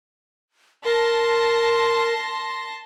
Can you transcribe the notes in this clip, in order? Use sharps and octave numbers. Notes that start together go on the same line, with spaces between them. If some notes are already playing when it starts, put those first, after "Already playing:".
A#4 A5 C6 A#6